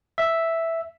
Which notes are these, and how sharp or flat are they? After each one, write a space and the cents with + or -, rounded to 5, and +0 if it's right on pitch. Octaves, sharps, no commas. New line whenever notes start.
E5 +0